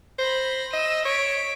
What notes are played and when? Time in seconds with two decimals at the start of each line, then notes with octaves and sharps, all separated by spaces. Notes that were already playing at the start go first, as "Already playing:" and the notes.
0.19 C5 B5 A#6
0.73 D#5 E6 D#7
1.05 C#5 B6 D7